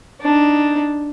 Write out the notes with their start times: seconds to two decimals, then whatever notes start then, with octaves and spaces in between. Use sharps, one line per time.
0.21 D4 D#4